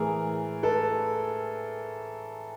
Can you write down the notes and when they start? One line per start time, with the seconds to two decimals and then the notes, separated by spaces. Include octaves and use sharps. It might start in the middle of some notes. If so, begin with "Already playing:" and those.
Already playing: A2 E3 G#4 A#4
0.63 A4 B4